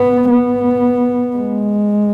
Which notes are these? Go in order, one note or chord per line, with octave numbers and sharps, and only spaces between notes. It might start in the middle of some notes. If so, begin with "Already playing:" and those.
Already playing: B3
B3
G#3